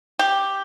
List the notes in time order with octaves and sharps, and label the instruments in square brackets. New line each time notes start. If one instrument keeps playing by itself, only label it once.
[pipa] G4